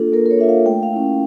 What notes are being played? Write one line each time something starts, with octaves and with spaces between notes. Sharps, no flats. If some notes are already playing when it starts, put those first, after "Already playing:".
Already playing: A#3 D4 F4 A4
A#3 A#4
A#4
C#5
D4 F4 E5
F5
A3 G5
F5
C#4 E4